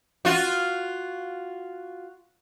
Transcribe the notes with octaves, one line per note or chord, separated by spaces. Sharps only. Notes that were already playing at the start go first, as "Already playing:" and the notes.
F4 F#4